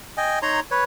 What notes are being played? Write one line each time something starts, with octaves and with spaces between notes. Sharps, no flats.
D#5 G5 G#5
D#4 C#5 A#5 C6
B4 C#5